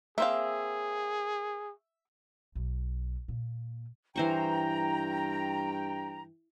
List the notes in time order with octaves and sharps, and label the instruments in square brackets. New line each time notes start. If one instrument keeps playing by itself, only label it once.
[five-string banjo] A#3 C4 F5 [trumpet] G#4 [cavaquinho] E5
[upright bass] B1
A#2
[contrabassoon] G2 [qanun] E3 C5 C#6 [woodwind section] G5 [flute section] A#5